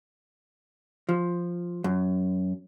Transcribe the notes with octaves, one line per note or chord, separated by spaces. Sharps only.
F3
F#2